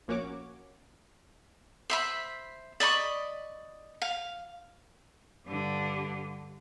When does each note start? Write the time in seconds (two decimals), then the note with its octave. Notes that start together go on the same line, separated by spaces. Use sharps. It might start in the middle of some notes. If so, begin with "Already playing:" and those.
0.08 A#1 A#3 C#4 F#4 C#5 D6
1.90 C5 E5 B5
2.80 D5 D#5 B5 C#6
4.02 F5
5.46 G2 D3